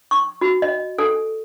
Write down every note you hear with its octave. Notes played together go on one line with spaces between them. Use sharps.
C#6
F#4
D#5
A4